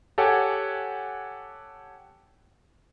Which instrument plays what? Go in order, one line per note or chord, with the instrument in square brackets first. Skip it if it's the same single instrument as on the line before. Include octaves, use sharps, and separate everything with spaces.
[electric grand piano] G4 A4 C#5 F#5 G#5